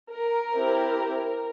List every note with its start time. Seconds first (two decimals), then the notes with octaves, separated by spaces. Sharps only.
0.12 A#4
0.54 C4 E4 G4